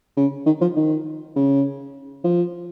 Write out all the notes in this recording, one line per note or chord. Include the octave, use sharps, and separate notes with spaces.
C#3
D#3
F3
D#3
C#3
F3